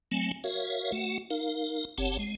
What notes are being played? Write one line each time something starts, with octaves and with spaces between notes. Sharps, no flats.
F#3 A3 C4 G#5
F#4 A#4 C#5 E5 F5
A3 F#4 F#5
D#4 A#4 F5
F#1 C4 G4 C#5 F#5 A5
G#3